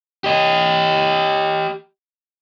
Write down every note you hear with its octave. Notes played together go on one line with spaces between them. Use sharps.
G4 D#5